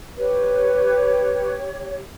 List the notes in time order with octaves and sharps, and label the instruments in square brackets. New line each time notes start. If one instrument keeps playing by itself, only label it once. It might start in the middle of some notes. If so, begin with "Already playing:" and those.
[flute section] G4 C#5 [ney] B4